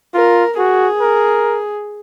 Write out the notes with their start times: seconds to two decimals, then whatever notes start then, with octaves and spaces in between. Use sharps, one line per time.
0.14 F4 A#4
0.58 F#4 G#4
1.00 A#4